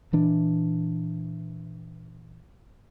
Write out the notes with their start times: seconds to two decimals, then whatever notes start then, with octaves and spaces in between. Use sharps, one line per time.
0.12 A#2 E3 D4